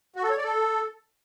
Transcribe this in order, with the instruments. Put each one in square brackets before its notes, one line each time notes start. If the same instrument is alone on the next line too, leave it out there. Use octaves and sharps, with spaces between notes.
[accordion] F#4
A4
C#5
D5
A4